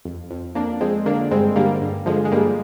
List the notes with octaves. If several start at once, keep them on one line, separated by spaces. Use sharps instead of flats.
F2
F2
F2 A#3 D4
F2 G#3 C4
D3 A#3 D4
G2 G#3 C4
D3 G3 A#3
G2
D3 F3 G#3
G#3
G2 G3 A#3